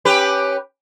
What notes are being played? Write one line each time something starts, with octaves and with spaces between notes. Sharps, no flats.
C#4 G4 B4